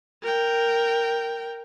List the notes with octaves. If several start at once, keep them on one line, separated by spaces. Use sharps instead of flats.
A#4 G5